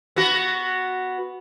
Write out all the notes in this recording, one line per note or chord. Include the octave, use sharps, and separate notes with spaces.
B3 F#4